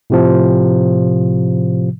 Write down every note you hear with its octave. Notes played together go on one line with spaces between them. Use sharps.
A2 C3 F3